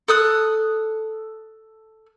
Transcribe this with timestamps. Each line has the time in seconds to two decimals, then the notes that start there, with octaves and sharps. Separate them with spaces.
0.08 A4 D#6 F#6